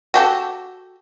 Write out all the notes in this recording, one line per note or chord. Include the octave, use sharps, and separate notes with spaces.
F#4 G4 A4